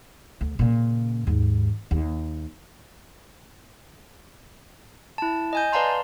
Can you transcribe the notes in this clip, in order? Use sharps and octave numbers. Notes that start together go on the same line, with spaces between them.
D2
A#2 C#3
D#2 G#2
D#2
E4 A5
D#5 G#5 G6
B4 D5 F5 A5 A#5 C6